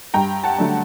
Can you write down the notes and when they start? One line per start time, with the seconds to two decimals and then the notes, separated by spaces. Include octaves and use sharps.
0.14 G2 G5 A#5
0.44 F#5 A5
0.58 D3 F#3 A3 D4